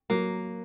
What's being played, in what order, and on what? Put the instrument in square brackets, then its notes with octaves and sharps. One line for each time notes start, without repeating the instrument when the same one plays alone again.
[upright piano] F#3 [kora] A#3